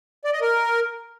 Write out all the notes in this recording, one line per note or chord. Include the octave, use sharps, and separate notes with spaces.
D5
D#5
A#4